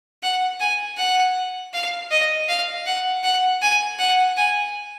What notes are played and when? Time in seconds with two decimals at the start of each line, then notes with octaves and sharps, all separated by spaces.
0.23 F#5
0.60 G#5
0.98 F#5
1.74 F5
2.11 D#5
2.49 F5
2.86 F#5
3.23 F#5
3.62 G#5
3.99 F#5
4.37 G#5